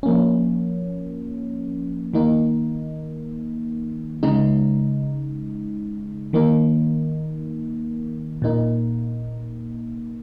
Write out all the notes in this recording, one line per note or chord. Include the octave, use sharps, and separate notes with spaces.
F3 A#3 C#4
D#3 A#3 D#4
C#3 G#3 D#4
D#3 A#3 D#4
A#2 A#3 D#4